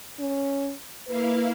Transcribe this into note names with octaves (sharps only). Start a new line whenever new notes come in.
C#4
A#3 E4 B4 F5